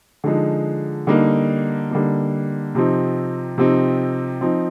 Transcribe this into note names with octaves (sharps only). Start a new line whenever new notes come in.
D3 F3 G#3 D#4
D3 G3 A#3 D#4
D3 G3 A#3 D#4
C3 F3 C4 D#4
C3 F3 C4 D#4
F3 C4 D#4